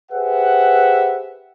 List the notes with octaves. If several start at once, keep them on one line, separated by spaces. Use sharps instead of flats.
G4 G#4 B4 C5 E5 F#5